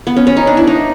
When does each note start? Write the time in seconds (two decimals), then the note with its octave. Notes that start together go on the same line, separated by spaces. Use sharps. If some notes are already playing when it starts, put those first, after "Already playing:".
0.07 B3
0.17 C#4
0.27 C#4
0.37 D#4
0.47 D4
0.57 E4
0.67 D#4